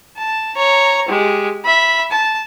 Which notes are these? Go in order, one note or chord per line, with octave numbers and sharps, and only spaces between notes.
A5
C#5 A#5
G#3 G4
E5 B5
A5